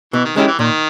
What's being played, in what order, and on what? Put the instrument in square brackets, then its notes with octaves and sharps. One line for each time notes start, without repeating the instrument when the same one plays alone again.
[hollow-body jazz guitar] B2 [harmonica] E3
[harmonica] D#3
[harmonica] D#3 [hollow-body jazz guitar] G#3 C#4 E4 G4
[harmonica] E3
[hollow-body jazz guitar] A#2 [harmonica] D#3